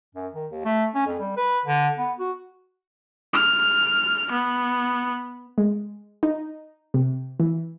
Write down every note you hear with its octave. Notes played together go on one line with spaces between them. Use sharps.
F#2
D#3
D#2
A3
C#4
F2
G3
B4
D3
B3
F#4
F6
B3
G#3
D#4
C3
E3